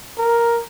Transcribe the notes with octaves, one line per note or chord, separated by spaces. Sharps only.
A#4